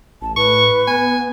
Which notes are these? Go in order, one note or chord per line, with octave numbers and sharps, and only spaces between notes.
A1 A5
A2 B4 C#6
B3 G#5